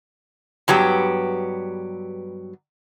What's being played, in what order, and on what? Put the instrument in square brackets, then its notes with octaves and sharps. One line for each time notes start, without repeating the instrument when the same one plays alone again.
[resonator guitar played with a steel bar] G2 F#3 B3 G4